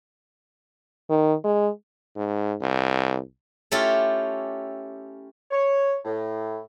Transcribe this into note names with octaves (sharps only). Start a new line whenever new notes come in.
D#3
G#3
G#2
C2
A3 C#4 E4 F4 G4 A4
C#5
A2